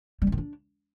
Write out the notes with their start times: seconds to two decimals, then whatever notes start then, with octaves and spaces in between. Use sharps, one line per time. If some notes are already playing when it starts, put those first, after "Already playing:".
0.22 G3
0.27 C#4
0.32 D#3
0.38 D4